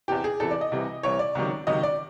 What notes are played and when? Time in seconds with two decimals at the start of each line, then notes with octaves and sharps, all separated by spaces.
0.08 E2 C3 E3 G4
0.24 G#4
0.40 E2 C3 E3 A4
0.51 D5
0.61 D#5
0.72 C2 C3 E3
1.03 C2 C3 E3 C#5
1.19 D5
1.35 C#2 C3 D#3 F#3
1.67 C#2 C3 D#3 F#3 D#5
1.83 D5